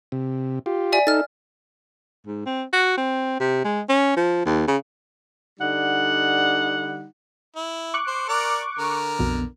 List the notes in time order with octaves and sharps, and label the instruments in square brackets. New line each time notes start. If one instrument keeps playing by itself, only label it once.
[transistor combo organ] C3
F4 G4
[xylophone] D5 E5 G#5
[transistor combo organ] D#4 A4 [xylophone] F6 A6
[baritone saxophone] G#2
C4
F#4
C4
C3
G#3
C#4
F3
D#2
C#3
[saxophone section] D3 G3 D#4 F#5
[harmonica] E4
[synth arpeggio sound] C#6 D6 F#6
[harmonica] C5
A#4 D5
D3 A#4
[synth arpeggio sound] B1 F2 B2